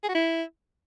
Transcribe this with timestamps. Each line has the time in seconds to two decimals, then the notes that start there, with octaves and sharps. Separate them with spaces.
0.03 G#4
0.09 F#4
0.15 E4